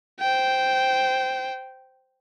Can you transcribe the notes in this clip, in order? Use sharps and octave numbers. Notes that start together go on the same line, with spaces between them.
C5 G5